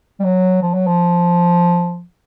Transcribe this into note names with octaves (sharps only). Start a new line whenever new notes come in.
G3
F#3
F3
F#3
F3